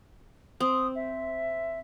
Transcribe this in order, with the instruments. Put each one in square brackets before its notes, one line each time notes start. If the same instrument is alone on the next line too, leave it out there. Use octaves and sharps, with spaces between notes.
[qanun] C4 [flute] D#6
[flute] E5